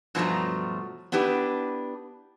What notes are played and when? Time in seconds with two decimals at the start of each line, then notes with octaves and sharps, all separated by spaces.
0.15 G2 B2 F3 F#3 A3 A#5
1.12 B3 D4 E4 G4 B4